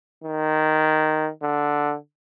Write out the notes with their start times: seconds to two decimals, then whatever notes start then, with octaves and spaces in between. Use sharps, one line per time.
0.24 D#3
1.42 D3